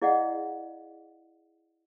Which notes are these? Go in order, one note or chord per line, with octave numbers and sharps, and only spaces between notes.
E4 G#4 D5 D#5 F5 F#5